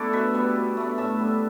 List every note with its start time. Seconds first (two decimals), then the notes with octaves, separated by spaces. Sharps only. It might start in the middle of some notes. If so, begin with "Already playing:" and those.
Already playing: A3 B3 D4 E4 A4 D5
0.13 B2 B4 E5
0.34 G3 B3
0.56 B2
0.77 A3 D4
0.98 A2 E5 A5
1.19 G3 B3 D4